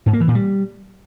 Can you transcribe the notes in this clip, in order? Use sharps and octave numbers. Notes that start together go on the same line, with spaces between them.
G#2
A#3
E3
A#2
G3